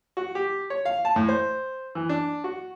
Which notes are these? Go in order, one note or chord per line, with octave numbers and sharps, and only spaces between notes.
F#4
G4
C#5
F5
A5
A2
C5
E3
D4
F#4